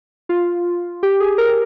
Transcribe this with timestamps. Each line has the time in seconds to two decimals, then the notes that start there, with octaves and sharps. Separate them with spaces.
0.29 F4
1.03 G4
1.20 G#4
1.38 A#4